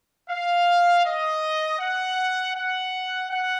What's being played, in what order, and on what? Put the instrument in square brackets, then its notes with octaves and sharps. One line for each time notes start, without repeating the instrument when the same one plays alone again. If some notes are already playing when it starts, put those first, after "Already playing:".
[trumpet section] F5
D#5
F#5
F#5
F#5